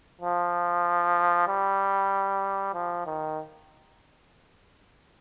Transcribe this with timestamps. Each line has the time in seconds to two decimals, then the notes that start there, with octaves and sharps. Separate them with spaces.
0.21 F3
1.48 G3
2.74 F3
3.06 D#3